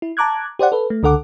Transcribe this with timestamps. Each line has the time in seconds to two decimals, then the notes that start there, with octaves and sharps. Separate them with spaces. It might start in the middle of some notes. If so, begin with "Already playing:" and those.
0.02 E4
0.17 A5 A#5 D6 F#6 G#6
0.59 G4 C5 D5 F#5
0.72 A4 B4
0.90 A3
1.03 C#2 D3 A4 F#5 D6